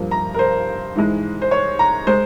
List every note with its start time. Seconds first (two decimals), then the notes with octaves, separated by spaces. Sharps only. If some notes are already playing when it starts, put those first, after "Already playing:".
Already playing: G2 F3 A#3
0.11 A#5
0.34 A#4
0.39 C5
0.95 G#2 E3 G#3
1.42 C5
1.51 C#5
1.79 A#5
2.07 G#3 C5